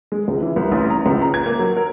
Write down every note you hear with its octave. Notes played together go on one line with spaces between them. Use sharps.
G#3
C#2
E3
C2
A1
A#5
C#2
A#5
G#6
A#3
F#3
A#4